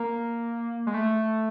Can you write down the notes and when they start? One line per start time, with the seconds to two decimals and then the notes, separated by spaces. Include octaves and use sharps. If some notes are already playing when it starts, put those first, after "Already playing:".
Already playing: A#3
0.87 G#3
0.94 A3